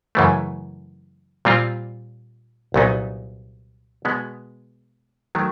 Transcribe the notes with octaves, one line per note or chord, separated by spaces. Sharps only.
F#2 C#3 E3 A3
A#2 G3 C4 F4
C2 A#2 F#3 B3 D#4
B2 G#3 B3
D#3 F#3 A3